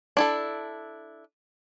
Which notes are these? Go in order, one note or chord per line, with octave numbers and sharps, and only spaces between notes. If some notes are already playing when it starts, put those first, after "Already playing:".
D4 E4 A4